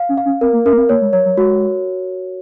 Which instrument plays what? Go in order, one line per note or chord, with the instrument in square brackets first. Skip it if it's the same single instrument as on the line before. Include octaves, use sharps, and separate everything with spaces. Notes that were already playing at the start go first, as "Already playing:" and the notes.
Already playing: [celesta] F5
[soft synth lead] C#4
[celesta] F5
[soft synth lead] C#4
[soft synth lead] C4 [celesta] A#4
[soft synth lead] A#3
[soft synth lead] C#4 [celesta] A#4
[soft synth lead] A#3
C4
[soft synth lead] A#3 [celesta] C#5
[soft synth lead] G#3
[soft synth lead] F#3 [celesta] C#5
[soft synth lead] F#3
[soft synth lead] G#3 [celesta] F#4